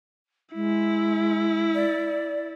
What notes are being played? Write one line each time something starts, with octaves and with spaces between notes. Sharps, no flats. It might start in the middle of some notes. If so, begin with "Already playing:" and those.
G#3 E4
D5